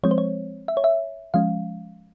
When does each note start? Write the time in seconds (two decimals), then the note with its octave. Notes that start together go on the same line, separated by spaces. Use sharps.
0.03 F3 G#3 C4 C#5
0.11 C5
0.18 C#5
0.68 E5
0.77 C#5
0.84 E5
1.34 F3 G#3 C#4 F5